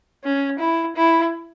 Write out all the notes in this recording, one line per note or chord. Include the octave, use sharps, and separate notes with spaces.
C#4
E4
E4